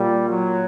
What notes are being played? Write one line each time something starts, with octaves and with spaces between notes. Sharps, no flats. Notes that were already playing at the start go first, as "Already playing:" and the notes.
Already playing: A#2 G3
F#3